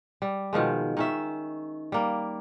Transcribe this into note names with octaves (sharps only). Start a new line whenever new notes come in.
G3
B2 D#3 F3 G#3
D#3 C#4 E5
G3 A#3